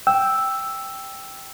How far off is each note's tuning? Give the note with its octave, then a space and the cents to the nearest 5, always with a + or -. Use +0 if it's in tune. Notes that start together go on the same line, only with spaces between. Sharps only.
G5 +0 E6 +0